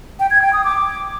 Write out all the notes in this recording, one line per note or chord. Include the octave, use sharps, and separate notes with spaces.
G5
G#6
G5
D#6
D6